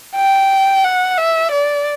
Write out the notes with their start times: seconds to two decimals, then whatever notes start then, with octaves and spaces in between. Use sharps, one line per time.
0.16 G5
0.84 F#5
1.18 E5
1.52 D5